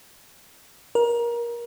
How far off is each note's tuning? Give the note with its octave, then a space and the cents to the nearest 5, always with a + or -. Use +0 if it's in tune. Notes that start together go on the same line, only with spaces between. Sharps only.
A#4 +25